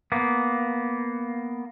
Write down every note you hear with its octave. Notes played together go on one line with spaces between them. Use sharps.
A#3 B3